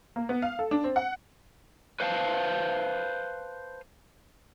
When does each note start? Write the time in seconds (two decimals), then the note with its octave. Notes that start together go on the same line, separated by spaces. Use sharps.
0.16 A#3
0.29 B3
0.42 F5
0.59 A4
0.71 D4
0.84 C4
0.96 F#5
2.00 B4 C5 F5 G5 A5